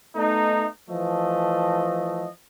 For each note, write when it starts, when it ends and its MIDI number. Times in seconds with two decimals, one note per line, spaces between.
0.16 0.66 57
0.16 0.66 59
0.16 0.66 63
0.90 2.27 52
0.90 2.27 53
0.90 2.27 57
0.90 2.27 75